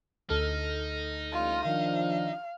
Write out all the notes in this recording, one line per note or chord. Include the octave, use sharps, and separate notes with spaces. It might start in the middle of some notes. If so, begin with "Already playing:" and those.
D2 D#4 A4 F6
A1 D#2 G3 F4
D#3 F3 D4 F5